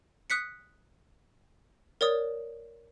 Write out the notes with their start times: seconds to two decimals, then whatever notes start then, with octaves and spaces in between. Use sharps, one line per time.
0.30 D#6 F#6 B6 C#7
2.01 A#4 C#5 D5 D#6